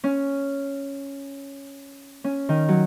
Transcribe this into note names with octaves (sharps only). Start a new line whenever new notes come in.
C#4
C#4
D#3
F#3